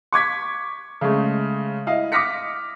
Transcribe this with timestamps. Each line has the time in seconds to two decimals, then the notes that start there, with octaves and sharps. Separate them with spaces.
0.13 C#6 D6 G#6 B6
1.01 C#3 G#3 A3
1.87 E4 D#5 F5
2.12 D6 D#6 F6 A#6 B6 C#7